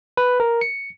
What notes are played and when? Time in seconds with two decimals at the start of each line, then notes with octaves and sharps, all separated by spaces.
0.17 B4
0.40 A#4
0.61 C#7